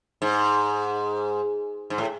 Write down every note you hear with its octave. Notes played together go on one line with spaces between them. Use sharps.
G#2
G#2
A2